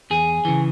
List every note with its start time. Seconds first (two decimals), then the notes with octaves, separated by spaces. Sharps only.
0.10 E2 G#4
0.45 C#3 E3